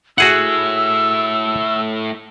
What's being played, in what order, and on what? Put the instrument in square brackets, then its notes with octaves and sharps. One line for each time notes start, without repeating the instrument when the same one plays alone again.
[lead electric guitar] A3 E4 [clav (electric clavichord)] F#4 G#4 F#5 [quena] E6